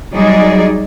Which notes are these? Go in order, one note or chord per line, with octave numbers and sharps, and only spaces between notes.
F#3 G3 D#4 G#4 D5 D#5